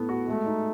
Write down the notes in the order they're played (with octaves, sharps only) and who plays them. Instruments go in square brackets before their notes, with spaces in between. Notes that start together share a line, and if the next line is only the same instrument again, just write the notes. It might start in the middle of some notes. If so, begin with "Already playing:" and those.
Already playing: [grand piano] A2 A3 B3
F#4
[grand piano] G#3 [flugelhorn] A3
[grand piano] D#4